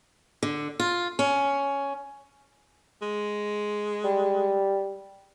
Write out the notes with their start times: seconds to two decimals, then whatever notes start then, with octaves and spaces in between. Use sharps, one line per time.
0.43 D3
0.80 F4
1.19 C#4
3.02 G#3
4.04 G3